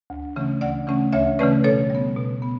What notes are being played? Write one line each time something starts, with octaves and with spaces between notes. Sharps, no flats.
D2
C#3 E3 A3 C#4
D2 D5 F#5
C#3 E3 A3 C#4
D2 C#5 E5
C#3 E3 A3 C#4 B4 D5
B2 A4 C#5
G3 B3
B2
B3